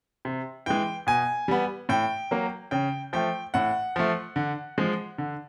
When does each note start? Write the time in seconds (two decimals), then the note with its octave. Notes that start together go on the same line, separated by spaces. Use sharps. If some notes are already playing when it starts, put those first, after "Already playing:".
0.25 C3
0.66 E3 G#3 G5
1.07 B2 G#5
1.48 G3 B3
1.89 A2 G5
2.31 F#3 A#3
2.71 C#3 G5
3.13 F3 A3 G5
3.54 A2 F#5
3.96 F3 A3
4.36 D3
4.78 F3 G#3
5.18 D3